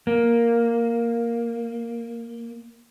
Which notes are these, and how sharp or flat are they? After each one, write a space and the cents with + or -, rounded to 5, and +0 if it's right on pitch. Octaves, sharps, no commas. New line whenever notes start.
A#3 +0